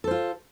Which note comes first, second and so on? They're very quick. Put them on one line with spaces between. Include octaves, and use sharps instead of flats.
A4 C5 F4